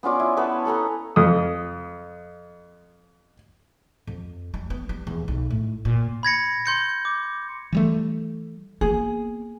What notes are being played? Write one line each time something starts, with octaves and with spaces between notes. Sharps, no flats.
B3 C#4 F4 D5
E4
B3 B4 A5 C#6
A4 G#5 A#5 B5
F2 D#6
F2
G3
B3
G3
E2
B1
A2
A#2
B5 G#6 A#6 C#7
C6 G6 C#7
D6
E3 G3 A3
A#3 B3 G#4